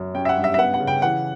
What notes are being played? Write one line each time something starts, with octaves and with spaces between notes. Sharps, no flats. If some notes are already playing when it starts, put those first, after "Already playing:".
Already playing: F#2
C#4 G5
E5
F#5
G2
E5
E5
B3 F#5
F#5
C#3
G5
E3 F#5